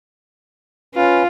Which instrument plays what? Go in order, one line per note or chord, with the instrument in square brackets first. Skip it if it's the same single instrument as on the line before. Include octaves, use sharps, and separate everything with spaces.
[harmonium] C#4 B4 [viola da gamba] F4